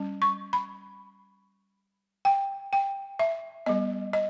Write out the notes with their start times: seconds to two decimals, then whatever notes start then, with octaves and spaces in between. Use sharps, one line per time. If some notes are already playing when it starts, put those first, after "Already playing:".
Already playing: G3 C#4
0.22 C#6
0.53 B5
2.25 G5
2.73 G5
3.19 E5
3.66 G3 B3 D#5
4.13 D#5